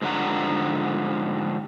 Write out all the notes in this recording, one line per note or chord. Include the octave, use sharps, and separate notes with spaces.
G#2 D3 F3 G3 F#5 A#5